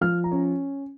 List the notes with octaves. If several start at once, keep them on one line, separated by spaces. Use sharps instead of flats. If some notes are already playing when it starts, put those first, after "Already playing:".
F3 F6
A#5
C#4